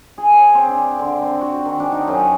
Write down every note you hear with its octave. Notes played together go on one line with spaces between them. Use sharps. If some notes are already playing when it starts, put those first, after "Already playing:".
G#4
C#5
C4
D4
D3
C4
F#4
D#3
D4
D#4
F#2